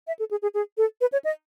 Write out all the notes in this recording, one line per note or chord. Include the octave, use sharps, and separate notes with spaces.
E5
A4
G#4
G#4
G#4
A4
B4
C#5
D#5